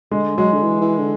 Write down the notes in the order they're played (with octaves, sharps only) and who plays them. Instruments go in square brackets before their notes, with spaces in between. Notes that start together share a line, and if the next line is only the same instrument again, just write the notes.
[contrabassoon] D3 [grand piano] G#3
[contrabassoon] F#3 [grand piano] G#3
[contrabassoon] D3
E3
E3
D3